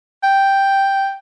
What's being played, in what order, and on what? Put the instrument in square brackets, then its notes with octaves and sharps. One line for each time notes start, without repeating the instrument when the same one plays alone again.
[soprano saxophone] G5